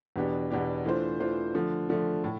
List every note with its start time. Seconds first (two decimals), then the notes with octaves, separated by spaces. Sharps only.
0.16 E2 B2 B3 D4 G4
0.51 E2 B2 B3 D4 G4
0.85 E3 A3 D4 F4 C5
1.20 E3 A3 D4 F4 C5
1.54 D3 F3 A3
1.89 D3 F3 A3
2.24 A2